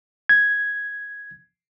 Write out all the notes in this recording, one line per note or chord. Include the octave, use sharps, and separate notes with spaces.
G#6